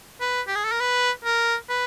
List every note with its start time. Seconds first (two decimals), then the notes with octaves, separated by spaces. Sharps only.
0.21 B4
0.47 G4
0.55 G#4
0.64 A4
0.72 A#4
0.80 B4
1.25 A#4
1.69 B4